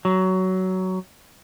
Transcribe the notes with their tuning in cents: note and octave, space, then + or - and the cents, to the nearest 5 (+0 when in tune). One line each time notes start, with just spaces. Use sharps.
F#3 +15